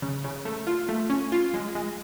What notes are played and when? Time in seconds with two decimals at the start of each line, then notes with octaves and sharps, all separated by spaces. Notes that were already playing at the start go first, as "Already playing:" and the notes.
0.02 C#3
0.24 C#3
0.45 A3
0.67 F4
0.89 A3
1.10 C#4
1.32 F4
1.54 G#3
1.75 G#3